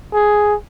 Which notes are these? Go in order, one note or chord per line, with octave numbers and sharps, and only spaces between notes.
G#4